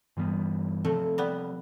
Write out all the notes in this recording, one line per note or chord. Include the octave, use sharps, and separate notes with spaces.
G2 E3 G3 B3
C3 F3 A3 C4
G3 B3